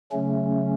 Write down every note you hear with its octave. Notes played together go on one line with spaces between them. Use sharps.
C#3 F#3 A3 C#4